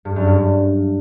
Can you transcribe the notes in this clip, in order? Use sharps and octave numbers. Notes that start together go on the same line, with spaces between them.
G2
F#2
G2